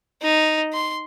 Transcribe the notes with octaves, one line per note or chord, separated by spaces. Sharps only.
D#4
C6